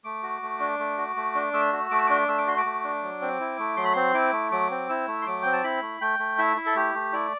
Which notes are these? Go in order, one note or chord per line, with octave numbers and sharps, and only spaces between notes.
A3 D6
F#4
A3
D4
A3
F#4
A3
D4
A3 E6
F#4
A3 D6
E6
D4 D6
A3 E6
D6
F#4 C6
D6
A3
D4
F#3
C4
E4
A3
F#3 C6
B5
C4 C6
E4 D6
A3
F#3 D6
C4
E4 E6
A3
C6
F#3 D6
C4 G5
A5
E4 B5
A3
A3 G5
A3
E4 E5
E4
A4
A3 G4
A3
E4 D5